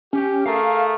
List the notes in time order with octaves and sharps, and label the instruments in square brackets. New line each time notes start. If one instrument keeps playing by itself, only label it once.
[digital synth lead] C#4 [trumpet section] G4
[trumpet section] A3 G#4 A#4 [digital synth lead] F5